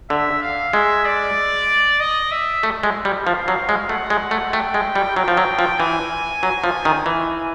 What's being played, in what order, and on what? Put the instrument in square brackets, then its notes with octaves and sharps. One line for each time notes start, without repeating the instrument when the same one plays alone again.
[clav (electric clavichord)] D3 [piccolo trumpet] E5
[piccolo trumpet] F5
[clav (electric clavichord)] G#3 [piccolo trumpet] E5
[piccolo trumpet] D5
D#5
E5
[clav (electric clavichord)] A3
G#3
G3
[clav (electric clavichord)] F3 [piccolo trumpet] F5
[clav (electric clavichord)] F#3
G#3
[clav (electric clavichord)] A3 [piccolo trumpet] F#5
[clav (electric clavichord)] G#3
A3
[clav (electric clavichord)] A3 [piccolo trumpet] G5
[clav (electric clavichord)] G#3
G3
[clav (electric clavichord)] F#3 [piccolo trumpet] G5
[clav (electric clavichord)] F3
F#3
F3
[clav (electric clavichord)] E3 [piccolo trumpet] G#5
[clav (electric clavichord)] F#3
F3
D#3
E3